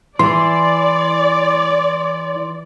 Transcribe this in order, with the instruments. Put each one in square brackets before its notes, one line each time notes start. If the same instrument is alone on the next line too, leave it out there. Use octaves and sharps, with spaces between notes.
[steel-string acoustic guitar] E3 [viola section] D5 [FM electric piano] C6